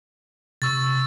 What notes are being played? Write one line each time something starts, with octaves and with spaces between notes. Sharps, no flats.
C3 C#6 E6 A6